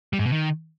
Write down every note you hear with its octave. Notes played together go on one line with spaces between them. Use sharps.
G3
G#2
B2
D#3